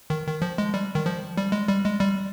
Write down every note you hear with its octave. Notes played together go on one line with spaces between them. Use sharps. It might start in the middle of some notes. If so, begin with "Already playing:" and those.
D#3
D#3
F3
G#3
G3
D#3
F3
G3
G#3
G3
G#3
G3